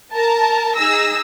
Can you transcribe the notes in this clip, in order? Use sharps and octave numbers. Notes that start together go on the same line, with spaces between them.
A#4 A5 A#5
D#4 G#4 E6 A#6